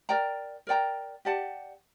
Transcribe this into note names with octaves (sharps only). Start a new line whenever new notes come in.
A#4 D5 G5 A#5
A#4 D5 G5 A#5
G4 D5 F#5 A5